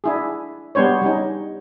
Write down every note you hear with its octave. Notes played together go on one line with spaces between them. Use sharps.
D4 E4 G#4
G3 B3 D4 C5 C#5
G3 C#4 D#4